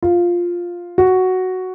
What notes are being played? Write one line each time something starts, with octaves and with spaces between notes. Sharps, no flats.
F4
F#4